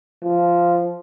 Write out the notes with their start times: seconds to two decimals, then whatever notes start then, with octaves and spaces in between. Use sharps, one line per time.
0.24 F3